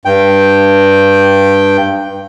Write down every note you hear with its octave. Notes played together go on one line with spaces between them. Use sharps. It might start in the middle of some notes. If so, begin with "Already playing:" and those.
G2 G5